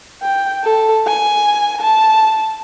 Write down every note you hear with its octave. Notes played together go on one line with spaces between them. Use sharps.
G5
A4
G#5
A5